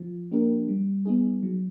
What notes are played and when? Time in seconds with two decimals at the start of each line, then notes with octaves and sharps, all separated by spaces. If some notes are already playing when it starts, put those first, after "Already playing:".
Already playing: F3
0.32 A#3 D4 G4 A#4
0.68 G3
1.05 B3 D#4 G#4
1.43 F#3